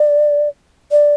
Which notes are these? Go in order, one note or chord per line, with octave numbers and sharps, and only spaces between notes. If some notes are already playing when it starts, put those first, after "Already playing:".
Already playing: D5
D5